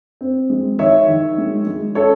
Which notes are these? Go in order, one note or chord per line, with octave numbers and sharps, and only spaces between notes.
C4
G#3
D#3 C#5 E5
D#3
G#3
G#3
C#4 A4 C#5